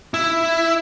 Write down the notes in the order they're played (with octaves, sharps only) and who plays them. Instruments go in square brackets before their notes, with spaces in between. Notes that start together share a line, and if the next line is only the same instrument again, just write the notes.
[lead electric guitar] E4